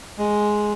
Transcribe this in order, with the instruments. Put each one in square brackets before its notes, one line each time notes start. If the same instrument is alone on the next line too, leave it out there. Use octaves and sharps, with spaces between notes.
[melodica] G#3